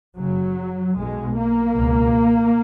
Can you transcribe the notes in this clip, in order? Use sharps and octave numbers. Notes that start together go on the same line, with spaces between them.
F#1 F#2 C#3 F#3
B1 B2 G#3
A#3
C#2 B2